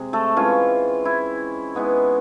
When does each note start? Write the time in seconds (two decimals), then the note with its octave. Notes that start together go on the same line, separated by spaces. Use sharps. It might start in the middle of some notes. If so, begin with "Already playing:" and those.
Already playing: C3 G#3
0.13 A3 A4
0.36 E3 G#3 C#4 F4
1.05 E4
1.75 E3 G#3 B3 D#4